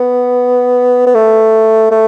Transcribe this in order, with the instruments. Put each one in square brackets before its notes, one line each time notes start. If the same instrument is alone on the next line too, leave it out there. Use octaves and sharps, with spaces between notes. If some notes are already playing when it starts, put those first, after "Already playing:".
Already playing: [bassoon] B3
B3
A3
A3